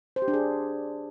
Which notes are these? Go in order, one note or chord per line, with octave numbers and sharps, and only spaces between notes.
C5
G4
D4
G#4